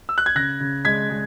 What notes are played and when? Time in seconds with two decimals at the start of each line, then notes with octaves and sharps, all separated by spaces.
0.09 E6
0.18 F#6
0.26 G#6
0.35 C#3 F#6 A#6
0.60 C#3
0.85 G#3 G#6 B6
1.10 G#3